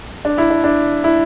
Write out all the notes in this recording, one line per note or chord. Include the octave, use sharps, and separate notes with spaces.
D4
E4
D4
D4
E4